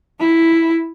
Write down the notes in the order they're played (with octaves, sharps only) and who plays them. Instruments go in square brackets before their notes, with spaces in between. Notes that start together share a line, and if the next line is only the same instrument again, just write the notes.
[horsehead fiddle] E4